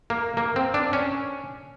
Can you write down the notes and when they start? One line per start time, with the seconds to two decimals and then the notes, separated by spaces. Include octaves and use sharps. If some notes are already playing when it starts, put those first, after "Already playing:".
0.10 A#3
0.37 A#3
0.56 C4
0.74 D4
0.93 C#4